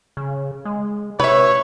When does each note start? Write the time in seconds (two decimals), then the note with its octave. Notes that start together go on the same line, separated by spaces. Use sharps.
0.17 C#3
0.65 G#3
1.20 C3 B4 C#5 E5